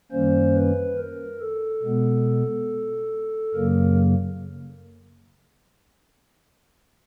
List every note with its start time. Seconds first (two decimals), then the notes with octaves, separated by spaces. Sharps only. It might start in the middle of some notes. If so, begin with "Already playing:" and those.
0.12 F#2 D#3 G3 A#3 C#4 C5
0.55 B4
0.98 A#4
1.40 A4
1.83 B2 G#3 B3
3.54 F#2 C#3 F#3 A#3 A#4